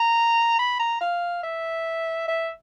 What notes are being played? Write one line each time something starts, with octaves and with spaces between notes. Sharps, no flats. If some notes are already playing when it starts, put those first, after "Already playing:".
Already playing: A#5
B5
A#5
F5
E5
E5